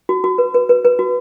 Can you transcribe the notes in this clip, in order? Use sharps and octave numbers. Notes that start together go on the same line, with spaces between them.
F#4
F#4
B4
B4
B4
B4
F#4